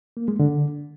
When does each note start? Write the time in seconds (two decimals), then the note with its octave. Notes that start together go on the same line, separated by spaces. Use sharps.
0.17 A#3
0.28 G#3
0.40 D3